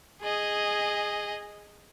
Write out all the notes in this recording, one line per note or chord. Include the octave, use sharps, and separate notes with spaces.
G#4 D#5